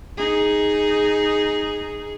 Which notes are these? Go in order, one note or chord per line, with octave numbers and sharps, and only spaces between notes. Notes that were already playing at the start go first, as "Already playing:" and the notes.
D#4 G#4